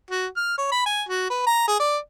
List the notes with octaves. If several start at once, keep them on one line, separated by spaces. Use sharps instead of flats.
F#4
F6
C#5
B5
G#5
F#4
B4
A#5
G#4
D5